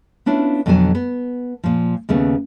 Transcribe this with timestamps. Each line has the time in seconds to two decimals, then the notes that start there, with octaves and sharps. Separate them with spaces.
0.26 B3 C#4 D4 E4 F4
0.66 F2 B2 D3 F#3 G#5 A5
0.95 B3
1.64 A#2 F3
2.09 D#2 C#3 A3 B3